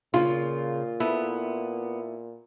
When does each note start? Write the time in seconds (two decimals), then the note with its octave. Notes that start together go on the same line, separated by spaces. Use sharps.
0.14 A#2 C#3 F4
1.00 B3 E4 A4 B4